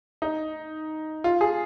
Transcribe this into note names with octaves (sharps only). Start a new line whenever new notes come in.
D#4
F4
G#4